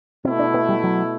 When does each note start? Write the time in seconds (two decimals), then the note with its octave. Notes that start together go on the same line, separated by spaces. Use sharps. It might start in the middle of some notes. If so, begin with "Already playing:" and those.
0.25 B2 A3 C4 E4
0.39 D4
0.54 B3
0.69 G3
0.84 F#3